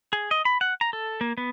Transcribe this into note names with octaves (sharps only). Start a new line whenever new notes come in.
G#4
D#5
B5
F#5
A#5
A4
A#3
B3